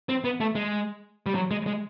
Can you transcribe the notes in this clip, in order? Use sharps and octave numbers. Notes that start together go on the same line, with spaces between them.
C4
B3
A3
G#3
G3
F#3
G#3
G#3